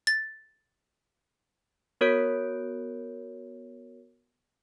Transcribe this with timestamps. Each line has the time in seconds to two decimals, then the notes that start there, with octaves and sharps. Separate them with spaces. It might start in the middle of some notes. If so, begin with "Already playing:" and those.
0.07 A6
2.01 B3 F#4 A#4 C#5 G6 D7